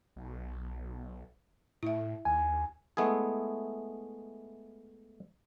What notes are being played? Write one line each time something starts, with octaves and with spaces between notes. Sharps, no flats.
B1
A2 E4 E5
D#2 G#5
G#3 A3 B3 E4 G#4